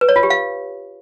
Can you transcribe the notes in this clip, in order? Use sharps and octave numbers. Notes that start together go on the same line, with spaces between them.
B4
C#5
F4
G4
F5